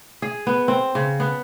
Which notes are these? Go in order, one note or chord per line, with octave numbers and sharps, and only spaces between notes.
G#4
B3
C4
C#3
B3